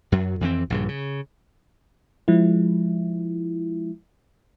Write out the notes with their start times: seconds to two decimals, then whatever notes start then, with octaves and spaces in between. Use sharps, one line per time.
0.12 F#2 F#3
0.41 F2 E3 C4
0.70 A#1 G2 C#3
0.88 C#3
2.28 F3 G#3 E4